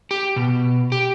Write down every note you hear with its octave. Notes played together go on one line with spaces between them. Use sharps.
G4
B2
G4